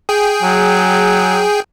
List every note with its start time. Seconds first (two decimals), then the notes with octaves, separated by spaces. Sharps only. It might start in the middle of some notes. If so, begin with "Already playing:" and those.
0.09 G#4 G5
0.43 F#3